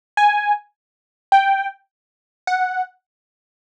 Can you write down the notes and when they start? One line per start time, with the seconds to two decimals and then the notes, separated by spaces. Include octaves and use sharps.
0.17 G#5
1.32 G5
2.47 F#5